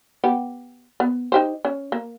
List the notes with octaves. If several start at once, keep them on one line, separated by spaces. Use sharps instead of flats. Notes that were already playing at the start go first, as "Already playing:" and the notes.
B3 G4
B3
D#4 G4 C5
C#4
A#3